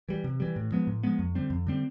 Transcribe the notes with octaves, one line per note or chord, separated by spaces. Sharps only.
E3 G3
C3
E3 G3
A2
F3 G#3 B3
A2
F3 G#3 B3
F2
D3 G3 C4
F2
D3 G3 C4